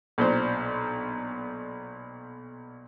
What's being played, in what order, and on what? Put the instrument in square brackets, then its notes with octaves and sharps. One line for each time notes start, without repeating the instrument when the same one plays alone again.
[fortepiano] B1 A#2 D4 C5